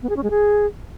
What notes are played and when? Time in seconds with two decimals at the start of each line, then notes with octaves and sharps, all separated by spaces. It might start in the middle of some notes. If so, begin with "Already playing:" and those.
0.02 B3
0.09 G#4
0.16 C#4
0.23 G#3
0.30 G#4